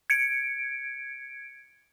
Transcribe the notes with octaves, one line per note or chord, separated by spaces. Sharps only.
G#6 C#7 D7